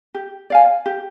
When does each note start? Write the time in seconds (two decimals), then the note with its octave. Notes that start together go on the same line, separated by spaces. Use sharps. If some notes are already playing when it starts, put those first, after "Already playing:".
0.14 G4
0.50 D5 F5 G#5
0.86 G4